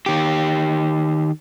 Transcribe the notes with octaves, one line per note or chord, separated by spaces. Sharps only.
D#3 G4